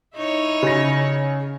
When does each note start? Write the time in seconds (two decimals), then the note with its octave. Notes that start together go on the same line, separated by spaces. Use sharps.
0.16 D#4 E4 C#5
0.63 C#3 A#6